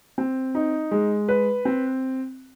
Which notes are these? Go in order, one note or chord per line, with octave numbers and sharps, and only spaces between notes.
C4
D#4
G#3
B4
C4